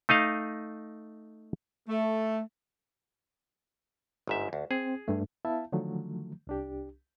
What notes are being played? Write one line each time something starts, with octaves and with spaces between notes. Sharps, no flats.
A3 D#4 D#5 F5
A3
G1 G#2 E5
D2
C4 G#4
G2 A3
B3 E4 E5 F5 A5
D3 D#3 F3 F#3 A3
C2 D4 G4